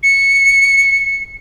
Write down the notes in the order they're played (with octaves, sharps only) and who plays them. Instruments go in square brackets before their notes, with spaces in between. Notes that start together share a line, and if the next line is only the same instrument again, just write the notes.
[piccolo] C#7